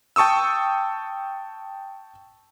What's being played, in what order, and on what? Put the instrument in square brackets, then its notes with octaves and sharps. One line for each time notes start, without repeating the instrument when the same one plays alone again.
[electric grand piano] G5 A5 C#6 D#6 E6